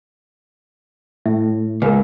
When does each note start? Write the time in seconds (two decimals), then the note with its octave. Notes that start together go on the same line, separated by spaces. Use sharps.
1.26 A2 E5
1.82 C#2 A#4 B4